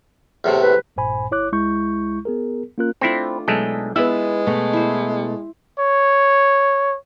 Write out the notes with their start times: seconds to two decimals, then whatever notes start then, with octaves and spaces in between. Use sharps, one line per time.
0.44 E2 A2 C3
0.62 B4
0.96 A#1 G2 A#2 C5 G#5 B5
1.31 G1 E4 C#5 D6 F#6
1.52 C#2 G#3 E4 C#6 G6
2.25 B3 G#4 A#4
2.78 A#3 C#4 F4 A#4 F#6
3.01 A3 C4 D4 E4 F4
3.48 B1 G#3 A3 D4 G#4 A4 G5
3.96 G#3 B3 E4 F4 B4 E5 A5 B5
4.47 B2 A3
4.73 E4 C5
5.79 C#5